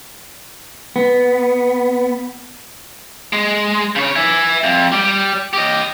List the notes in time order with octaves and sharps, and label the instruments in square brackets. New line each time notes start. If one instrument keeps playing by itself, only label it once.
[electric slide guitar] B3
[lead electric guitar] G#3
C#3 C#5
E5 G#5
F2
G3
G4 D#5